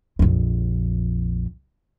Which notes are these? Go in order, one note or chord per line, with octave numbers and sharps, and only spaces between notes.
A#1 F2